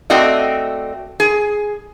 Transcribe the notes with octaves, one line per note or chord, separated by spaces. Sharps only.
A3 C4 F#4 D5 D#5
G#4